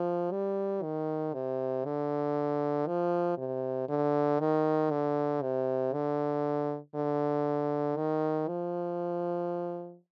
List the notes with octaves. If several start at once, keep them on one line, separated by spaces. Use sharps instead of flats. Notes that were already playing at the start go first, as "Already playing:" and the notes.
Already playing: F3
G3
D#3
C3
D3
F3
C3
D3
D#3
D3
C3
D3
D3
D#3
F3